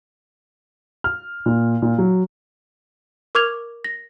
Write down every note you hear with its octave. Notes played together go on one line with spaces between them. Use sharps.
F6
A#2
A#2
F#3
A#4 C#6 D6 F6 G#6 F7
A#6